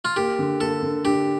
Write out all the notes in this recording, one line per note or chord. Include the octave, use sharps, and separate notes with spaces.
F4
A#3 G4
D3
A#3 A4
D3
D4 G4